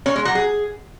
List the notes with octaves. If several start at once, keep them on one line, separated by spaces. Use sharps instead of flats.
C#4
G#3
F#3
G#4